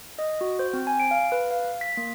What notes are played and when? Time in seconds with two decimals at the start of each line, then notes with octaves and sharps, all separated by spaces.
0.19 D#5
0.41 F#4
0.59 C5
0.73 C4
0.87 G#5
1.00 D7
1.11 F5
1.32 B4
1.51 F5
1.81 B6
1.97 A#3